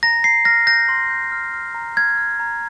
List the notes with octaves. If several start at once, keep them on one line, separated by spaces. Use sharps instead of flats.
A#5 A#6
A#5 C7
F6 A#6
G6 A#6
C6
G6
F6
F6
A#5
F6 G#6
F6
A#5